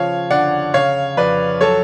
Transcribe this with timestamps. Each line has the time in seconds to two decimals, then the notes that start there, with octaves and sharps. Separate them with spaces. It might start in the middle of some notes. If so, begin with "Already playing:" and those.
Already playing: C#3 F3 C#5 F5
0.30 D3 D5 F#5
0.74 C#3 C#5 F5
1.17 F2 B4 D5
1.61 F#3 A4 C#5